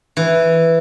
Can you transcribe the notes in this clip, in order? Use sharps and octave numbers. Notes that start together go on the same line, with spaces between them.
E3